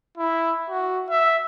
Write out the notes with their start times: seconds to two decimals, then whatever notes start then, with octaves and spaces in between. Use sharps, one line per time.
0.17 E4
0.70 F#4
1.10 E5